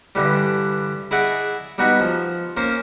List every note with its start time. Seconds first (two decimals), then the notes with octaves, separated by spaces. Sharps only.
0.15 G2 D3 E3 G3
1.11 E4 G#4 D5 D#5 F#5
1.78 G3 B3 D#4 F#4 G#5
2.00 F3
2.57 A#3 C#4 C5